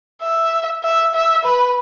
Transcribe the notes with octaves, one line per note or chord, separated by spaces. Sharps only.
E5
E5
E5
B4